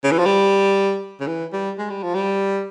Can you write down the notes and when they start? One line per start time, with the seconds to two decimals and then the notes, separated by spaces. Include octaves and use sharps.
0.04 C#3
0.11 E3
0.19 F3
0.26 G3
1.20 C#3
1.27 E3
1.53 G3
1.79 G#3
1.90 G3
2.03 F3
2.15 G3